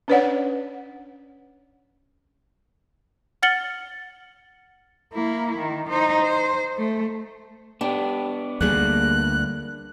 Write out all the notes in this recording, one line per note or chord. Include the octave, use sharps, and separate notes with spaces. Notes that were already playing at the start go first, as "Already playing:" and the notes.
C#4 D4 B4 C#5 D5 F#5
F#5 F6 A6 C#7 F#7 G7
A#3 E4
D#3
D#4 C5
C5
A3
B3 D4 G4
D2 G3 A#3 G#4 F#6